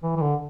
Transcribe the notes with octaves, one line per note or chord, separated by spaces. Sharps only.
E3
E3
D3